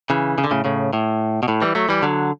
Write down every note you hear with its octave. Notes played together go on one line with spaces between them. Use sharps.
C#3 E3
C#3
D3
A2 C#3
A2 C#3
A2
B2
A2
E3 G3
F#3 A3
E3 G3
D3 F#3